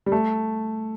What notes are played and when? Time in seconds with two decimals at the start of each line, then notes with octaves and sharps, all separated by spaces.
0.06 G3
0.12 A3